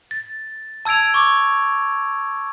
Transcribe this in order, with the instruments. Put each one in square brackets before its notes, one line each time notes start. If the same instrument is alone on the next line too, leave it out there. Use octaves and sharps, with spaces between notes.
[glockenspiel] A6
A5 E6 G#6 D7 F7
C#6 D6